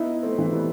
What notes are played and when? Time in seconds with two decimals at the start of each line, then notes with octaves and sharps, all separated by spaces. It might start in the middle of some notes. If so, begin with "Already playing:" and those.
Already playing: B3 D#4 E4
0.23 A3 C4
0.38 E3
0.53 G3 B3